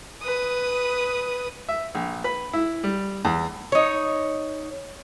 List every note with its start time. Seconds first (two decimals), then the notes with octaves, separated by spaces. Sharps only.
0.22 B4 D#6
1.69 E5
1.95 A#1
2.24 B4
2.53 E4
2.84 G3
3.25 E2
3.72 D#4 C#5